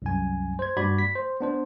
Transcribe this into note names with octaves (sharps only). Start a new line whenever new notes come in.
C2 F#2 G#5
C5 G#6
G2 F#4 D5 B5 G#6
B6
C5
B3 D4 C5